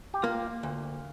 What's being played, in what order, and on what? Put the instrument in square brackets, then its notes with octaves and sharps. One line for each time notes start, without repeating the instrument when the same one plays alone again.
[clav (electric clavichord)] G4
[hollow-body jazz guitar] A#3 [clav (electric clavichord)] F4
[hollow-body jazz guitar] D2